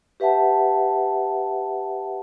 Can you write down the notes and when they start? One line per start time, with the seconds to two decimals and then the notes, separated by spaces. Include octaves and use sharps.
0.20 G4 B4 E5 F#5 A5